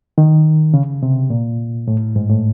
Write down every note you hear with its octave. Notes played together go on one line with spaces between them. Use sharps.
D#3
C#3
C3
A#2
A2
G#2
A2